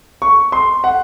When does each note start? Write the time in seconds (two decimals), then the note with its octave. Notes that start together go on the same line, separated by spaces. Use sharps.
0.22 C#6
0.52 C6
0.84 F#5